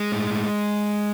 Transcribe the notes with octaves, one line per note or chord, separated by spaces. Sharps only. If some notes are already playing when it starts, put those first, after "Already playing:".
Already playing: G#3
A2
A2